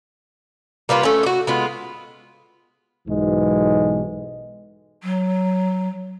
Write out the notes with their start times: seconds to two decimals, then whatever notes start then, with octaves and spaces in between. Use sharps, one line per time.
0.89 G3 A#3 B3 F4
1.03 A3 C#4
1.23 F#4 G4
1.47 G#3 B3 F4
3.08 B1 G#2 B2 E3 G#3
5.03 F#3